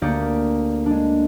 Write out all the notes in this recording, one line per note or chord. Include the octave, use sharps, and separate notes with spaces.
D2 A#3 G4 D5 D#6 C#7
G#3 D4